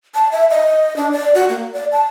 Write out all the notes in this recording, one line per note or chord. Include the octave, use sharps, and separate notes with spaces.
A5
E5
D#5
D4
D5
F#4
A#3
D5
A5